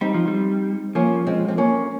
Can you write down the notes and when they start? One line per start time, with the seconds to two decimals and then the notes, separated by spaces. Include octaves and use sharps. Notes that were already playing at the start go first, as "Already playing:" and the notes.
0.01 G3 C4 D#4
0.14 F3
0.28 G3
0.95 F3 A#3 C#4
1.27 G#3 C4
1.48 C4
1.58 A#3 C#4